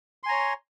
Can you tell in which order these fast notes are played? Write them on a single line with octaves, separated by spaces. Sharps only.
C6 G#5 A#5 C#5